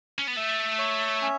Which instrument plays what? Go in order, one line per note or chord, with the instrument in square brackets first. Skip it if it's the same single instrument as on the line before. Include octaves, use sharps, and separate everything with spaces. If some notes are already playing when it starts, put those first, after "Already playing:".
[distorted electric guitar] C#4
B3
[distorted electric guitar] A3 [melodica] E5
[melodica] C#5
C#4